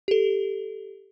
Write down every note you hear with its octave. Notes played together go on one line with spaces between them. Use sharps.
G4 A4